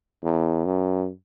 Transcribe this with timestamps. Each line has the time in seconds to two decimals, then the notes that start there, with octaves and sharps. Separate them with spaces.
0.23 E2
0.65 F#2